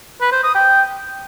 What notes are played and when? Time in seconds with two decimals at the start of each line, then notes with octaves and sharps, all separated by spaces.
0.21 B4
0.32 C5
0.43 D#6
0.55 G5